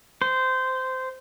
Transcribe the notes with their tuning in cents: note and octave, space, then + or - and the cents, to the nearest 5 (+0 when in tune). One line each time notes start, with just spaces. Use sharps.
C5 -15